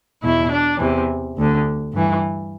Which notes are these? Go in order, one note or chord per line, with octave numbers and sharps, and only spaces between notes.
E2 B2 E4
D4
E2 C3 E3
D2 D3
G2 E3